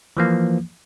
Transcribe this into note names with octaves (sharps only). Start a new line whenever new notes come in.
E3 F3 A#3